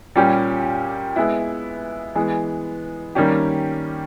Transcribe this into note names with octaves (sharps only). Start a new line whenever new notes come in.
A#2 G3 C#4 G4
G#3 B3 E4
E3 G#3 B3
D#3 G3 A#3 C#4 G4